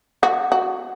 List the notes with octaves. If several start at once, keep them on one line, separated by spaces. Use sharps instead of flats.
F#4
F#4